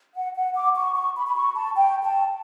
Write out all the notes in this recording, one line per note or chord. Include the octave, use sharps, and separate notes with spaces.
F#5
F#5
D6
C#6
C#6
B5
B5
C#6
A5
G5
A5